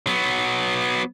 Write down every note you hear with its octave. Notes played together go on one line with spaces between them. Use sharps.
F#3 B3